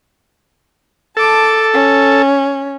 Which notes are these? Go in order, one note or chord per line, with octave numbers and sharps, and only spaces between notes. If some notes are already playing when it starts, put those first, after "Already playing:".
A4 A5 D6
C#4